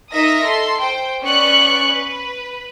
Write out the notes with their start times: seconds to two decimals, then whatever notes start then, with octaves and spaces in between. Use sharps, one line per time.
0.12 D#4 A#4 D#5 E5 D#6 A#6
0.44 A4 C6
0.82 C5 G5
1.22 B3 C#4 D5 C#6 F#6 C#7
1.87 B4